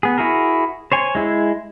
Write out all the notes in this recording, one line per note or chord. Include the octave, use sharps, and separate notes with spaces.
B3 G#4
E4 F#4 G#4 A#4
C5 C#5 G#5
G#3 E4 G#4